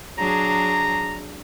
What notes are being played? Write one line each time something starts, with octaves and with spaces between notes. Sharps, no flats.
F#3 D4 G#4 A#5